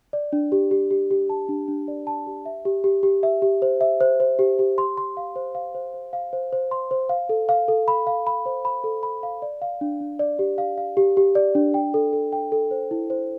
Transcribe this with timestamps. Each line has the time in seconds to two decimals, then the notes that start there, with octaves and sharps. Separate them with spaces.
0.13 D5
0.33 D4
0.52 G4
0.71 G4
0.91 G4
1.11 G4
1.30 A5
1.49 D4
1.68 D4
1.88 D5
2.07 A5
2.27 G4
2.45 E5
2.65 G4
2.84 G4
3.03 G4
3.23 E5
3.42 G4
3.62 C5
3.81 E5
4.01 C5
4.20 C5
4.39 G4
4.59 G4
4.78 C6
4.97 C6
5.17 F5
5.36 C5
5.55 F5
5.75 C5
5.94 C5
6.13 F5
6.33 C5
6.53 C5
6.71 C6
6.91 C5
7.09 F5
7.29 A4
7.49 F5
7.68 A4
7.88 B5
8.07 F5
8.27 B5
8.46 C5
8.65 B5
8.84 A4
9.03 B5
9.23 F5
9.42 D5
9.62 F5
9.81 D4
10.01 D4
10.19 D5
10.39 G4
10.58 F5
10.78 F5
10.97 G4
11.17 G4
11.35 D5
11.55 D4
11.74 G5
11.94 A4
12.13 A4
12.32 G5
12.52 A4
12.71 C5
12.91 E4
13.10 C5